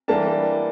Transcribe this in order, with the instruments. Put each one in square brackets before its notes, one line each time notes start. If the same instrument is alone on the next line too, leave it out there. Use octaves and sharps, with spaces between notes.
[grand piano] E3 G3 A#3 D4 A5